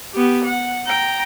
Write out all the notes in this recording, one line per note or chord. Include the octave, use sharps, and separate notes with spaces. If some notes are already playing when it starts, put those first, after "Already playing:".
B3 G4
F#5
G5 A#5